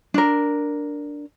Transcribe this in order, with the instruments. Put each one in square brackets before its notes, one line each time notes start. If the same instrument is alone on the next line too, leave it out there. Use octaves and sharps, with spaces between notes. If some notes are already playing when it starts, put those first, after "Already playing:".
[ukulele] D4 A#4